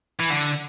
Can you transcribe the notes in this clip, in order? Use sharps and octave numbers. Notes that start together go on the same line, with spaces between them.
E3
D3